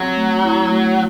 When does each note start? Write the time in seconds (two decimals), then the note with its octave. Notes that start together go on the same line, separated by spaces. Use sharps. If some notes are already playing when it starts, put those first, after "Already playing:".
Already playing: F#3 C4
0.16 A3
0.43 E4
0.69 A3